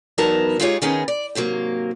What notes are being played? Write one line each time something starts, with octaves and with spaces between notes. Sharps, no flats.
E2 F#3 B3 D#4 A#4 A5
G#3 D#4 F4 G4 G#4 C#5
D#3 B3 C#4 D#4 G#4
D5
G#2 C3 F#3 A#3